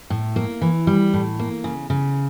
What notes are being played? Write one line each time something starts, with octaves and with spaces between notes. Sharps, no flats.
A2
A#3
E3
G3
A2
A#3
C#3
C#3